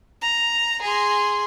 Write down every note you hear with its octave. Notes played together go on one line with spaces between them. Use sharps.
A#5
G#4 C6